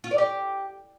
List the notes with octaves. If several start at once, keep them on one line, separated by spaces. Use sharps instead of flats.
F4
D5
G4